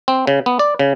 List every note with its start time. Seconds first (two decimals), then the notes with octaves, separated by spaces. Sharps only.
0.08 C4
0.27 C#3
0.46 B3
0.59 D5
0.79 C#3